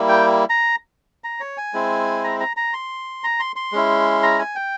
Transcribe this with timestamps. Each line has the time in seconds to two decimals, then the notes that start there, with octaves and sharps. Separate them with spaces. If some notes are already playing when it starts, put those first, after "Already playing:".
Already playing: G3 A#3 E4
0.09 G5
0.50 A#5
1.24 A#5
1.40 C#5
1.57 G#5
1.73 G#3 C4 E4
2.24 A#5
2.40 A#5
2.57 A#5
2.73 C6
3.24 A#5
3.40 C6
3.56 C6
3.72 G#3 C#4 E4
4.23 A#5
4.39 G#5
4.56 G5